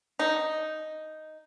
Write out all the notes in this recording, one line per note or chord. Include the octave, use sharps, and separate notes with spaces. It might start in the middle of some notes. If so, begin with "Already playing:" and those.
D#4